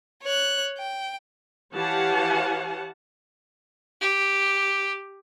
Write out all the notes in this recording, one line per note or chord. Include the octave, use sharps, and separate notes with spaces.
C#5 F#6
G5
E3 G4 C#5 F5 F#5 A5
G4